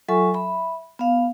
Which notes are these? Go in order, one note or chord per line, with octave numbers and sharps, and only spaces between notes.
F#3 F4 A4 E5 G#5 C#6
E5 B5
B3 F5